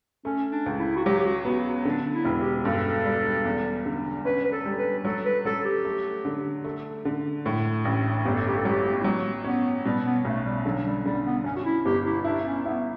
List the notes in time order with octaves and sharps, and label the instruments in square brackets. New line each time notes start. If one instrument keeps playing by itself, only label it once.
[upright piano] A3 [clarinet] C#4
[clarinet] D4
[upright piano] C#2
[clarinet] E4
F#4
[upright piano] F#3 [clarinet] G4
[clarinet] G4
F#4
[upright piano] B3 [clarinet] F#4
[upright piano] D3 [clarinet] D4
[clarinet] E4
[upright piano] E1
[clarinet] G4
[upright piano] G2 [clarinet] A4
[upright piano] G3
E2
D3
[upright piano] C#4 [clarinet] B4
[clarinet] B4
A4
[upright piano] G3
[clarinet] B4
[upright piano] F#3 [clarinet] A4
[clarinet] B4
[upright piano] F#3 [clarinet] A4
[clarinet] G4
[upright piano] A3
D3
A3
D3
A2
A1
[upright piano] G1 [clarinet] G4
[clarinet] A4
G4
A4
[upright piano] F#3 [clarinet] G4
[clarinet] E4
[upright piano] F#3 [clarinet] F#4
[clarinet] B3 [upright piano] C#4
[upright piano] B2 [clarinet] G3
[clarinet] B3
[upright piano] B1 [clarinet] A3
[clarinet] G3
[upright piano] D3 [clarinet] F#3
[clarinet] G3
[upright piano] D3 [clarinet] G3
[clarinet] B3
[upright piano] F#2 [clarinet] C#4
[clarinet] F#4
E4
[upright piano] G1 [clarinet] G4
[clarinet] E4
[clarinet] D4 [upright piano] E4
[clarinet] C#4
[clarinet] B3 [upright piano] E4